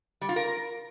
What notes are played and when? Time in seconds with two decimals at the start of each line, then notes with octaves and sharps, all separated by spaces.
0.21 G3
0.29 F4
0.36 A#4